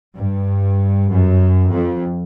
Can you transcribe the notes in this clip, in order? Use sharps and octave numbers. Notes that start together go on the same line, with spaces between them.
G2
F#2
F2